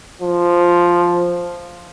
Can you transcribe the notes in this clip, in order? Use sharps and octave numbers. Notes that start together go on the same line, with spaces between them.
F3